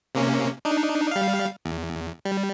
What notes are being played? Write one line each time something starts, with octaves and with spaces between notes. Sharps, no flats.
C3 A#3 C#4
D4 D#4
G3 F5
E2
G3